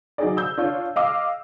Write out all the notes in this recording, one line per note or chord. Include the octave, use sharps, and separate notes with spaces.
F#3 D#4 G#4 D5
E6 G6
D4 F4 C#5
D#5 F5 D6 E6